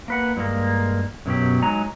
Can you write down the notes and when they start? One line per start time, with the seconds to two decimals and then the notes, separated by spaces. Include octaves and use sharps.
0.08 A#3 B4 F#5
0.37 G2 G#3 A#3
1.26 F#2 B2 F#3 G4
1.62 F#3 G#3 D#4 G#5 A#5